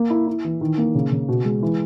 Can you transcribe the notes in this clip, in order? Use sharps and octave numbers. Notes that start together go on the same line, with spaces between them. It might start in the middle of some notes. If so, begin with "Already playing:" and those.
Already playing: A#3
E4
E4
E3
D#3
A#3
C#3
C#3
B2
G#3
E3